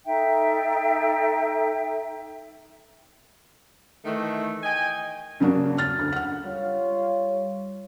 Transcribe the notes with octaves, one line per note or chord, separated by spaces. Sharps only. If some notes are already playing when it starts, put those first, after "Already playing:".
D#4 A4 E5 G5
D#3 E3 A3
D#5 G5 G#5
G2 C#3 F#3 A#3 D4 F#4
F6 A6
D2
F#5 F6
G3 F4 C#5